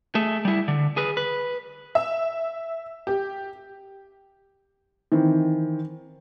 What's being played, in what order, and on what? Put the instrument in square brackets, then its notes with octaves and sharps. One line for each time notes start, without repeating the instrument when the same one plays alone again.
[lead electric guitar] A3 G#4
G3 E4
D3
G#4 B4
B4
[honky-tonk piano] E5
G4
[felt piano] D#3 E3 C4